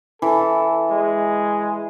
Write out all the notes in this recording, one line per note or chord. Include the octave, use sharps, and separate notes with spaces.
E3 A4
G#3